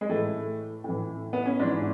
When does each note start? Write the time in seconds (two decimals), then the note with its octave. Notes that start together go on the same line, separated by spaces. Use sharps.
0.01 G#3
0.09 A2 E3 A3
0.84 A2 E3
1.33 B3
1.45 C#4
1.59 G#2 E3 D4